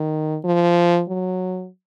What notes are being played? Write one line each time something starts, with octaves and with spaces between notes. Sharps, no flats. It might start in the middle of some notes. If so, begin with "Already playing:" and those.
Already playing: D#3
F3
F#3